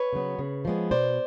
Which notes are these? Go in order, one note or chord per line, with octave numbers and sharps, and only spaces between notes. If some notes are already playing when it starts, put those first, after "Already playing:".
Already playing: B4 C#5
C#3 F#3 B3
C#3
F3 G#3 B3
B2 C5 D5